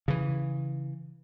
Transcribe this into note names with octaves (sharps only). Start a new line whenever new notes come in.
C#3 E3